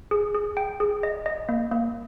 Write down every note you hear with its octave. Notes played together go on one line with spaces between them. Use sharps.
G#4
G#4
G5
G#4
D#5
D#5
A#3
A#3